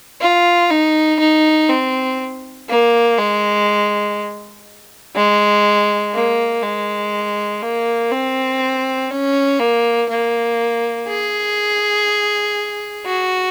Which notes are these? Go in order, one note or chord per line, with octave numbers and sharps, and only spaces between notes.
F4
D#4
D#4
C4
A#3
G#3
G#3
A#3
G#3
A#3
C4
C#4
A#3
A#3
G#4
F#4